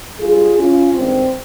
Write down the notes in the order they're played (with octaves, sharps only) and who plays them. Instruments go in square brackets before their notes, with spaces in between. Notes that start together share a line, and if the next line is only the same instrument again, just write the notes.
[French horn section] G2 G3 F4 G#4
C#4 F4
G2 D#3 G#3 C4